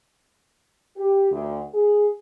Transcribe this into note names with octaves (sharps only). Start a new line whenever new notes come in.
G4
D2 D3
G#4